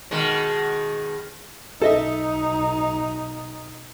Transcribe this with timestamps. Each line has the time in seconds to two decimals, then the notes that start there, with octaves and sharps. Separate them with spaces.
0.11 B2 D#3 G#3
1.82 B1 D#4 A4 D#5 E5